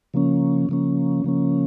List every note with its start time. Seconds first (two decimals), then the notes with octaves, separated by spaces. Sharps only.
0.14 C#3 F3 A#3 C#4
0.69 C#3 F3 A#3 C#4
1.24 C#3 F3 A#3 C#4